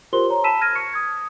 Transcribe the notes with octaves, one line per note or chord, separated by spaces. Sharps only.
F4 G4 A#4 C5 C6 G7
C#5 A#5
A5 B5 E6 B6 D#7 E7
F6 G#6 A#6 D#7
C#6 C#7
D#6 G#6